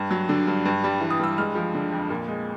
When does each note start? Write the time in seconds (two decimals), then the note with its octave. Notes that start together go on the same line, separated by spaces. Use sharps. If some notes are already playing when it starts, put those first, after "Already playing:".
Already playing: G2
0.11 F#3
0.29 D3
0.47 G2
0.65 G2
0.84 G3
1.01 E3
1.10 D#6
1.19 G2 E6
1.38 G#3 F6
1.55 F3
1.74 D3
1.92 F2
2.10 A#2
2.28 G#3